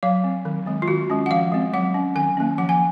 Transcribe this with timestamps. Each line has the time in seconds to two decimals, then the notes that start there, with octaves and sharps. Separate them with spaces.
0.03 F#3 F5
0.24 C4
0.45 D#3
0.66 G#3 C4
0.82 F4
0.88 D#3 F#4
1.10 G#3 C#4
1.26 F#5
1.31 F3 F5
1.52 G#3 C4
1.73 F#3 F#5
1.94 C#4
2.15 D#3 G#5
2.37 A#3 C#4
2.58 F3 F#5
2.69 G#5